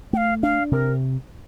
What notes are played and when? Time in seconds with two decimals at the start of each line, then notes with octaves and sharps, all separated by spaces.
0.13 A3 G5
0.17 F5
0.43 D4 F5
0.72 C3 A#4